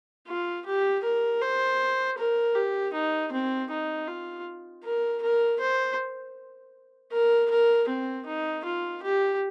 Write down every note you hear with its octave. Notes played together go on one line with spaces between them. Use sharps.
F4
G4
A#4
C5
A#4
G4
D#4
C4
D#4
F4
A#4
A#4
C5
A#4
A#4
C4
D#4
F4
G4